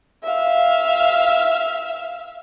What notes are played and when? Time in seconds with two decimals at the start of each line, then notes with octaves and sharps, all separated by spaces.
0.23 E5 F5